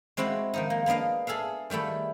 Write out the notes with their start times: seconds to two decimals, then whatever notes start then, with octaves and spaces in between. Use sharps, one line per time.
0.17 G#3 C4 E4 F#4 F#5
0.54 D#3 F3 D#4
0.70 A#3
0.86 A#3 B3 D4 D#5 F5
1.27 G#4 A4 E5 F5
1.70 D#3 G3 A3 E4